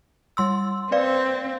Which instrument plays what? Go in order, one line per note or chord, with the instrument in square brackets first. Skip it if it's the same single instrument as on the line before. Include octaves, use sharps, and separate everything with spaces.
[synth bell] G3 C6 E6
[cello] C4 [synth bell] B4 D5 F5